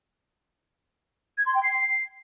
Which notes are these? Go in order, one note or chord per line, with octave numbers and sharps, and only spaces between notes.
G#6
C6
G5
C7